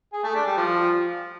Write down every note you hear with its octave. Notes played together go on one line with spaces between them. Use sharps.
G#4
A3
D4
G3
F3